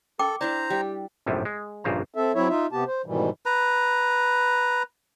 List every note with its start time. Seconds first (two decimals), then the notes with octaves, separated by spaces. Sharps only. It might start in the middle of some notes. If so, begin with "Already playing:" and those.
0.19 A4 A#4 G5 D6
0.41 D4 E4 C5 D5 A5 A#5
0.70 G3 G4
1.26 A#1 F#2 A2 C3 G3
1.45 G#3
1.84 A#1 G2 A#2 C#3 C5 A#5
2.15 C4 A4 E5
2.35 F#3 C4 E4 C#5 E5
2.49 D#4 F4 E5
2.72 C3 B3 G4 A5
2.87 C5
3.06 G#2 B2 D#3 E3 G3
3.46 B4 A#5